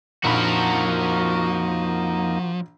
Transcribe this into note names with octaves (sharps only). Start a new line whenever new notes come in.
A#1 F2 F3 A#3 D#4 F#4 A#4 B5